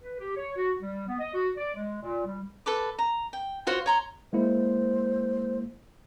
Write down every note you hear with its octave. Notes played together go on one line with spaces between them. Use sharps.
B4
G4
C#5
F#4
G3
B3
D#5
F#4
D5
G#3
A#2
G3
A4 B4 D6
A#5
G5
F4 F#4 C5 C#5
C#5 A#5 C6
G#3 A#3 E4 C5